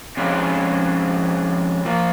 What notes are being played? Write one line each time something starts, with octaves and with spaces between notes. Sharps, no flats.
F2 C#3 G#3 C4 F4
F3 A#3 F4